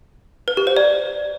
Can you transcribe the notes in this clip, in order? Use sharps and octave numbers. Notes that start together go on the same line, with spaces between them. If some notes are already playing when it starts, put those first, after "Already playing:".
B4
G4
C5
D5